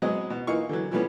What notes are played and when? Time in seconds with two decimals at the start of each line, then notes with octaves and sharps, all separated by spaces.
0.02 F#3 G#3 B3 C4 D#5
0.30 B2
0.47 E3 A#3 D#4 F4 C#6
0.69 D3 E3 F#3
0.91 E3 F3 G3 A3 B3 C#4